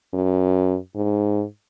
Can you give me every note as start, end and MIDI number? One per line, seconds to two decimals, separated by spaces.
0.13 0.77 42
0.95 1.44 44